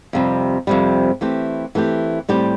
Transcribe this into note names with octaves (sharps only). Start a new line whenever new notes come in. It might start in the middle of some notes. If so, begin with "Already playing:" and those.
F2 C3 G3
F2 C3 G3
E3 A3 C4 G4
E3 A3 C4 G4
A2 G3 C4 G4